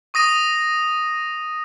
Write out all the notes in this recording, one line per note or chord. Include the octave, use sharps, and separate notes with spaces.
C#6 D#6 A#6 D#7